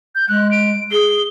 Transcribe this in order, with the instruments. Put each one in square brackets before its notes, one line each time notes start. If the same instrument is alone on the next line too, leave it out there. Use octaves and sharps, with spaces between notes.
[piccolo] G6
[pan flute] G#3 [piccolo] F#6
[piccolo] D7
[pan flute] G#4 [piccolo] G7